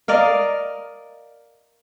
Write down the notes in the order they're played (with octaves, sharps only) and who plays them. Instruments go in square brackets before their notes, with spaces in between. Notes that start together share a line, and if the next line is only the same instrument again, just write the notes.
[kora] A#4 D5 D#5 F5